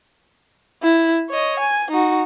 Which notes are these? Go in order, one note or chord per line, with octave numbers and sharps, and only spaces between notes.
E4
C#5 D#5
G#5
D#4 F#4